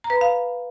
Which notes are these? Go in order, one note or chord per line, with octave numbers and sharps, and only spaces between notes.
A#5
B4
B5
F5